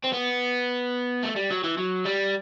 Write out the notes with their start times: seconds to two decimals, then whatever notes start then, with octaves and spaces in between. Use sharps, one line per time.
0.04 C4
0.14 B3
1.23 A3
1.36 G3
1.51 F#3
1.64 E3
1.77 F#3
2.05 G3